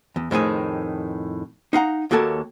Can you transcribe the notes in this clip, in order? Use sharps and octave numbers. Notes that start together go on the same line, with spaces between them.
E2
F2 A2 D#3 G#4
D#4 F5 F#5 A#5
D#2 A#3 F#4 A4 C#5 A5